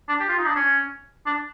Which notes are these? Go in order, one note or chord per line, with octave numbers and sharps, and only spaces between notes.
D4
G4
F4
D#4
D4
C#4
D4